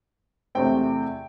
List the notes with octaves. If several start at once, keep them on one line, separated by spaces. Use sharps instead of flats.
E2 C3 A3 C4 G5